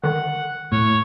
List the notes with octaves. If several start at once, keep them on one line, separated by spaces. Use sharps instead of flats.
D3 D#3 F#5
A2 C#5